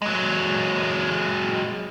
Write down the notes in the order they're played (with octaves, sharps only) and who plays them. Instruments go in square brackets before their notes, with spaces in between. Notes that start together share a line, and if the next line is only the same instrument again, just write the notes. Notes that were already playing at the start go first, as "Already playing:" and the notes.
[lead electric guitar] F#3 G#3